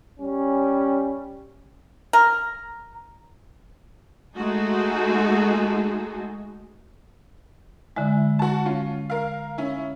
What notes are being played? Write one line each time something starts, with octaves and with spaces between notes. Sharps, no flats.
G3 C#4
A#4
G#3 A3 D#4 F#4 G#4 A4
D3 G#3 E4
F#4 A5
C#4 F4
A#4 F5
C#4 E4